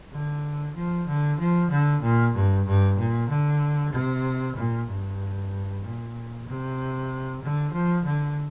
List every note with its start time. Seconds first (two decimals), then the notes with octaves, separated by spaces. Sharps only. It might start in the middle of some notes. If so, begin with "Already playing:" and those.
0.12 D3
0.75 F3
1.08 D3
1.39 F3
1.70 D3
2.02 A#2
2.35 G2
2.66 G2
2.98 A#2
3.29 D3
3.93 C3
4.56 A#2
4.88 G2
5.83 A#2
6.47 C3
7.42 D3
7.73 F3
8.05 D3